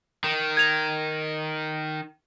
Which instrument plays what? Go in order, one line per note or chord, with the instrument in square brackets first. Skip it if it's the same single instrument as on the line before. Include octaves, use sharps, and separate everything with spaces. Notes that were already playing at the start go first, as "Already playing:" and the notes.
[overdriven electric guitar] D#3
[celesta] G#6 F7